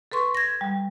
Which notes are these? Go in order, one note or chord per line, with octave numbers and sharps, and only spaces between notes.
A4 B4 C6 C#6
G#6 A#6
G3